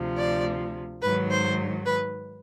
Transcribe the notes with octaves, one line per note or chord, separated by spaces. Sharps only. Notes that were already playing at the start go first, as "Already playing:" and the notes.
Already playing: D2 C3 F3
D5
G#2 D#3 F#3 B4
C5
B4